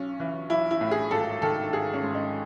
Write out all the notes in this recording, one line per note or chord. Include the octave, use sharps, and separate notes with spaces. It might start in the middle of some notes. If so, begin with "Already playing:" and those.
Already playing: B1 C#4
E3
B1 E4
E4
A2
G#4
G#1 A4
D#3 A4
G#1 G#4
C#4
G#2
D#4